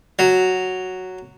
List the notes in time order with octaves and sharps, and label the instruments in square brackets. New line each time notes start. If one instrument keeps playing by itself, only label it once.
[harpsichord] F#3